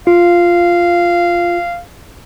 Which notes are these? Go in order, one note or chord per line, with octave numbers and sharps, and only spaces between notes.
F4 F5